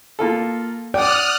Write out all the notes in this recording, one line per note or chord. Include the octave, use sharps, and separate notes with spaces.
A#3 F4 A4
D5 F#5 G5 D#6 F6 F#6